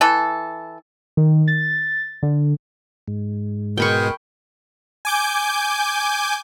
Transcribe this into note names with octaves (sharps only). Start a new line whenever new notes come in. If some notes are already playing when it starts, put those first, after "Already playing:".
E3 A4
D#3
A6
D3
G#2
B2 G#3 G#4 A#4 G5 B5 C#6
G#5 D6 G6